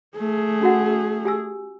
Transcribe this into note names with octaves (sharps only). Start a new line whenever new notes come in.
A3 G#4
C#4 F#4 F#5
G4 G#5 E6